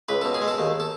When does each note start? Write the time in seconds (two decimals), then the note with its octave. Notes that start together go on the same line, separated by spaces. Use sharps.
0.08 C#2 B4
0.22 B2 A4
0.34 G#4
0.42 G#3
0.48 A4
0.58 D#2
0.80 A4